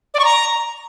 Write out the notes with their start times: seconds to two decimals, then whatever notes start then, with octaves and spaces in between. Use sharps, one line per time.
0.14 D5
0.19 C#6
0.25 A#5